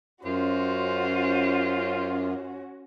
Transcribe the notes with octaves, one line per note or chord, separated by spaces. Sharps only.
F#2 C#4 F4 F#4 C5